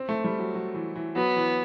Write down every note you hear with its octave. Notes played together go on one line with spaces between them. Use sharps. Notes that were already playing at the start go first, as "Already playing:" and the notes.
Already playing: C4
A3
G3
F#3
F#3
E3
E3
F#3 B3
E3